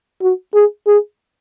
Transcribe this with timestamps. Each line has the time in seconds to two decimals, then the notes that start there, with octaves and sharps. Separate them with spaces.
0.22 F#4
0.54 G#4
0.87 G#4